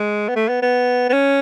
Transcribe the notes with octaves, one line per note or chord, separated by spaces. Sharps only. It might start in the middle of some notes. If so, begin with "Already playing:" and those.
Already playing: G#3
B3
A3
B3
B3
B3
C#4